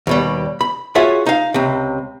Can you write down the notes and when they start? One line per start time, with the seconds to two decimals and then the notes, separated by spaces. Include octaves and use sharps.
0.07 D#2 B2 G3
0.61 B5
0.95 F4 F#4 G#4 C#5 E5 F#5
1.26 D#4 F5
1.54 C#2 C3